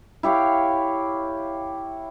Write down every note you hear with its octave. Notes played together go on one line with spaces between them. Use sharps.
E4 G4 C#5 F5